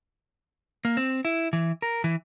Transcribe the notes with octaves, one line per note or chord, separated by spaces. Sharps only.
A#3
C4
E4
E3
A#4
E3